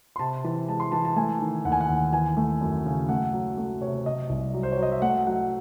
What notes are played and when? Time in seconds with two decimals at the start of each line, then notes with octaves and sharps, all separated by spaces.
0.16 C6
0.19 C3 A5
0.44 E3 A5
0.68 G#3 A5
0.80 C6
0.92 E3 A5
1.05 A5
1.16 A3 G#5
1.40 D#3
1.65 D#2 F#5
1.72 G#5
1.81 F#5
1.89 D#2
2.12 E3 G#5
2.37 A3
2.61 F#2
2.86 C#3
3.09 A3 F#5
3.33 F#3
3.58 A3
3.81 C3 C#5
4.06 C3 D#5
4.29 C2
4.54 F#3
4.63 C5
4.72 C#5
4.77 F#3
4.83 D#5
4.92 E5
5.02 A3 F#5
5.27 F#3 F#5